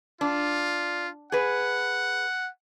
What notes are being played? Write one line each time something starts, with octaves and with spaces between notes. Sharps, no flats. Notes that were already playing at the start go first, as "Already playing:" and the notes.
D4 F4
G#4 B4 F#5